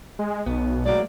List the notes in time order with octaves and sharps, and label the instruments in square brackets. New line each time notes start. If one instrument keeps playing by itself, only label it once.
[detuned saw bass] G#3
[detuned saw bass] B1 [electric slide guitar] B3
[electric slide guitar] A2 G#3 A#3 [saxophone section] F#3 D5